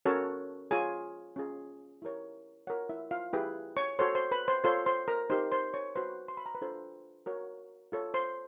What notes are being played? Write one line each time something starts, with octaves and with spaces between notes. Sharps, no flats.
C#4 F#4 A4 A#4 C#5 A5
F4 G#4 C#5 G#5
C#4 F4 G#4
E4 G4 A#4 C#5
F4 F#4 A#4 C#5 F#5
E4 E5
F4 F5
E4 G4 G#4 B4 G5
C#5 C#6
F#4 A4 C5 C#5 C6
C5 C6
B4 B5
C5 C6
F4 A4 C5 C#5 C6
C5 C6
A#4 A#5
D#4 G4 A#4 C5 C6
C5 C6
C#5 C#6
F#4 B4 C5 C6
C6
B5
A#5
B4 B5
D4 F4 A4 C5
F#4 A#4 C#5
F4 A4 C#5
C5 C6